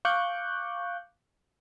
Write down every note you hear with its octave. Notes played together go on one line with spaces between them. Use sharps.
F5 C#6 D6 F#6 G6